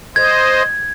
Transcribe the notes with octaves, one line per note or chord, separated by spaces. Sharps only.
C5 D#5 G#6